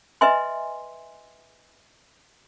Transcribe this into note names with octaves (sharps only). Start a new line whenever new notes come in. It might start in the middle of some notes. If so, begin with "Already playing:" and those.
B4 D#5 E5 G#5 C6